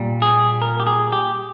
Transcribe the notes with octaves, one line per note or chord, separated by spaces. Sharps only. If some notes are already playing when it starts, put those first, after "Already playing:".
Already playing: A#2 G3
G#4
A#4
G4
G#4
G4